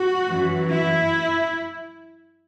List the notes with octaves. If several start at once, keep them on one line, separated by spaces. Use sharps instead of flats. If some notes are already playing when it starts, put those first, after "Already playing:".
Already playing: F#4
F#2 E3
E4